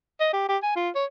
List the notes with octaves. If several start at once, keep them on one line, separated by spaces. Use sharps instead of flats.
D#5
G4
G4
G#5
F4
C#5